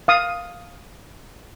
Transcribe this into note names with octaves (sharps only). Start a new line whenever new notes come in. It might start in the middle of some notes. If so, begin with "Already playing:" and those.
F5 D#6